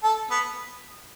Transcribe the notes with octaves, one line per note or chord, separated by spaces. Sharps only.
A4
B3